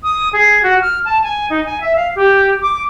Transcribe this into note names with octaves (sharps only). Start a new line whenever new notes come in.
D#6
G#4
F#4
F6
A5
G#5
D#4
G#5
E5
F5
G4
D6